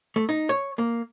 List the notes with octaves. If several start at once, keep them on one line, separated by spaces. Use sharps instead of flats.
A3
D#4
C#5
A#3